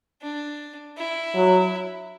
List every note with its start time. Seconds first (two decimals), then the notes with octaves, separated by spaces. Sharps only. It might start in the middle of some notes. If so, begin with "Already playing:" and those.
0.22 D4
0.98 E4
1.35 F#3